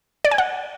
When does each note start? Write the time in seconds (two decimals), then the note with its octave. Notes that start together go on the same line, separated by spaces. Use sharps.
0.25 D5
0.31 G#5
0.38 F#5